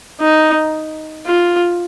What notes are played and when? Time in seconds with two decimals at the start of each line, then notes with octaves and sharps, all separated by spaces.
0.20 D#4
1.26 F4